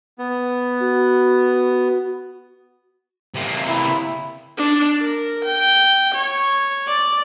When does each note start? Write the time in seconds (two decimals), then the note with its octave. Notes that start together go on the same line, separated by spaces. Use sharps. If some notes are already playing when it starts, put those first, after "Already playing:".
0.19 B3
0.80 F#4
3.34 C3 A#3
3.68 E4
4.57 D4
5.01 A#4
5.45 G5
6.15 C#5
6.87 D5